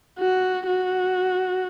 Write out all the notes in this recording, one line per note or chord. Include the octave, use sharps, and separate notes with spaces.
F#4
F#4